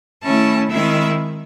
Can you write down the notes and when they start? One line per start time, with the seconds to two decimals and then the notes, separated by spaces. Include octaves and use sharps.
0.24 D#3 A3 C#4 E4 A5
0.71 D#3 G#3 C4 E4 E5